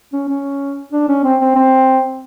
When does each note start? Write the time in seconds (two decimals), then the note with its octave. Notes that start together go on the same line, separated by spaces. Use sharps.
0.13 C#4
0.29 C#4
0.92 D4
1.08 C#4
1.24 C4
1.40 C4
1.55 C4